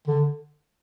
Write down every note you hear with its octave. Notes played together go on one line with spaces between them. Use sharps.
D3